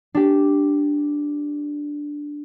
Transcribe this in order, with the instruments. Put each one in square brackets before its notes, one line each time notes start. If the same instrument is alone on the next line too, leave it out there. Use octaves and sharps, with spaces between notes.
[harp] D4 G4